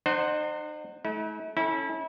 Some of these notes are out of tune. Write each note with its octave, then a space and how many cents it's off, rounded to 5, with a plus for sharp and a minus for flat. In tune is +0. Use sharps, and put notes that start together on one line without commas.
D#4 -40 C5 +0 F#5 +0
A3 -40 E4 -45
C#4 -5 E4 -30 A4 +0